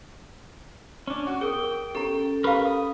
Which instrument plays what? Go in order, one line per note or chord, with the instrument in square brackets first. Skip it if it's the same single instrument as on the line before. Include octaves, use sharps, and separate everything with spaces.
[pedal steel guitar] C#4 D4
F#4
[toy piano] G#4 A#4 D#6 [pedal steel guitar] G5
[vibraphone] C#4 A4 [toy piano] G4 A#5
[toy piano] G4 F5 [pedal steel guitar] A#4 B4
[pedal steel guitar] D#6